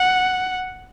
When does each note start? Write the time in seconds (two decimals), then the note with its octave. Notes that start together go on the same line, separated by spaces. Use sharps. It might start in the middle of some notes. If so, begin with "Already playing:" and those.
Already playing: F#5